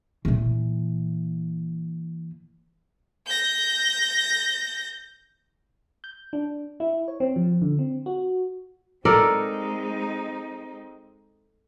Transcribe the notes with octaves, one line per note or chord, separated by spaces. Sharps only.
A#2 E3
G6 A#6
G6
D4
E4
C#5
C4
F3
D3
C4
F#4
G#3 C4 D#4 A4 A#4 D5